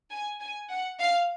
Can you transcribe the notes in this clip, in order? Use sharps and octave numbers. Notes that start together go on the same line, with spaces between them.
G#5
G#5
F#5
F5